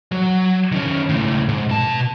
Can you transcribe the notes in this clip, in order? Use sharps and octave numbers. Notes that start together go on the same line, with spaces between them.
F#3
D#3 C#4
C#2 A2
G#2
B2 A5